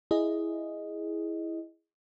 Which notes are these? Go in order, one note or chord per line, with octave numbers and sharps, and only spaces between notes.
E4 G#4 D#5